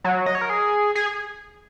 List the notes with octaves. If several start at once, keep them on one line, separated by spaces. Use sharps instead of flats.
F#3
D#5
C#5
A#4
G#4
G#4